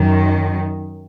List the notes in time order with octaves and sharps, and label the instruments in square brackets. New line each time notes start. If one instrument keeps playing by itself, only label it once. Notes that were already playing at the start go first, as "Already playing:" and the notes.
Already playing: [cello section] F#2 D#3